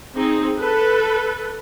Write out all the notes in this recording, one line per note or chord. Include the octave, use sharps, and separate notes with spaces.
C4 D#4 G#4
A4 B4